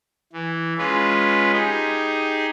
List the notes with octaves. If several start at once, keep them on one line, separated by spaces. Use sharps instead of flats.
E3
G#3 C#4 F4 B4
D#4 G4 G#4